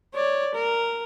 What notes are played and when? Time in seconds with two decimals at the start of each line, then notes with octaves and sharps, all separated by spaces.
0.14 C#5 D5
0.55 A#4